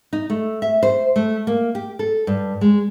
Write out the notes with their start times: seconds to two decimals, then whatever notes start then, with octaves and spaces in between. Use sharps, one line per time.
0.13 D#4
0.30 A3
0.62 E5
0.83 C5
1.16 A3
1.47 A#3
1.75 G4
1.99 A4
2.27 G2
2.61 G#3